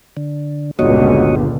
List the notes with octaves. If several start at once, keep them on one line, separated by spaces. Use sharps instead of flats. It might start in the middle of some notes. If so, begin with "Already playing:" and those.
D3
G1 C#2 A#2 D3 F#4 C#5 D#5